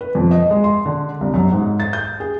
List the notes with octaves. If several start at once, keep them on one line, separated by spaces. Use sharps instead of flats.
B4
F2
D#5
G#3
C6
D3
C2
F#2
G#2
A6
G6
G#4